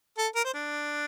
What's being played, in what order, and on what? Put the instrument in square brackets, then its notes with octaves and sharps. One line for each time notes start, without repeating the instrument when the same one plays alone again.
[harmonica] A4
A#4
C5
D4